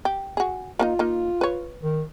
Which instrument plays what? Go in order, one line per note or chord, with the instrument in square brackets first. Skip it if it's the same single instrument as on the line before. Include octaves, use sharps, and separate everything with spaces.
[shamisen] G4
F#4 G#4
[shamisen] A#3 D4 D#4 [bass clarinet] F4
[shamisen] A#3 D#4
B4 C#5
[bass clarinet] D#3